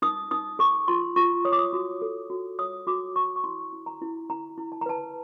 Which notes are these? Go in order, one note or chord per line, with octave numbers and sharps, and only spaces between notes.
D#4 D#6
D#4 D#6
G#4 C#6
F4 C6
F4 C#6
C#5 D#6
D6
D#6
F#4
A4
F#4
C#5 D#6
F#4 D6
F#4 C#6
C#6
E4 C6
E4
A#5
E4
E4 A#5
E4
A5
A#5
B4 A5